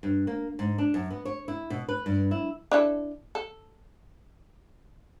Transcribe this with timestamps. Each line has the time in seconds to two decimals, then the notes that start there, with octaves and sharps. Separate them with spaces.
0.03 G2
0.27 A#3
0.59 G#2
0.78 D4
0.94 F#2
1.10 B3
1.25 C#5
1.48 E4
1.70 B2
1.89 B4
2.06 G2
2.31 E4
2.72 D4 E4 A4
3.35 A4